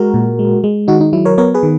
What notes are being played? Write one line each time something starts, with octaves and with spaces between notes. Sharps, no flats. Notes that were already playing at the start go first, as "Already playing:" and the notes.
Already playing: G#3 F#4 A#4
A#2
G#3
G#3
D#3 D#4 F#4
D#4
F#3 E4
A#4 C#5
B3 A#4 C#5
G#4 B4
D#3